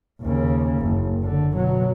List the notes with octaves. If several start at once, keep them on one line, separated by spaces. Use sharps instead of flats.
D#2 C#3
F#1
D3
B2 F#3